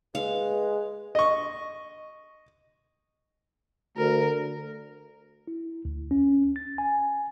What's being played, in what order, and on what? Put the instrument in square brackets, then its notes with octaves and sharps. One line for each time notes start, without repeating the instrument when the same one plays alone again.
[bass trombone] G#3 [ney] B4 [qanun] F5
[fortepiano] D#5 C#6
[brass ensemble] D2 [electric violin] A#4
[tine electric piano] E4
D2
C#4
A6
G#5